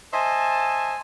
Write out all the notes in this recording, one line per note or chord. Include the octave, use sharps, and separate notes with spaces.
C5 D#5 E5 G#5 A5